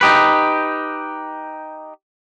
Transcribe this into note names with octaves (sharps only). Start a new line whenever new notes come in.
D#4 G4 B4